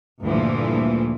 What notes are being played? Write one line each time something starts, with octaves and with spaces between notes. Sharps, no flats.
D2 G2 A#2 E3 F3